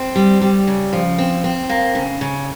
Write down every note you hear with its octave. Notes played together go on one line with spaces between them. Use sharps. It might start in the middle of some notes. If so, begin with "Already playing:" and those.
Already playing: C4
G3
G3
C#3
F3
C4
C4
A#3
C#3
C#3